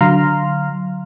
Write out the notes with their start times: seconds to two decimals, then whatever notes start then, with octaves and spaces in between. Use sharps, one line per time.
0.01 D3 F#3 F5 A#5 C6 F6